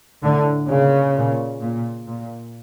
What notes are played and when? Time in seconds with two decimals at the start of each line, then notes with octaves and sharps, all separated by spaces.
0.23 A2 D3
0.69 A#2 C#3
1.15 A#2
1.61 A#2
2.07 A#2